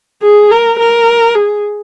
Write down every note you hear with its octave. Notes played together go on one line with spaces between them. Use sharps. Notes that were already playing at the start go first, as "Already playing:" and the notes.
G#4
A#4
A#4
G#4